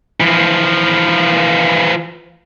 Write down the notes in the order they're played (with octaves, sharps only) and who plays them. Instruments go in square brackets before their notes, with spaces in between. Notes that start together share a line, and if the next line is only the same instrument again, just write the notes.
[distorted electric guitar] E3 F3